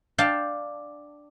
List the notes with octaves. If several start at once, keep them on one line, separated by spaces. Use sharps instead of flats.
D4 F5 G5 A5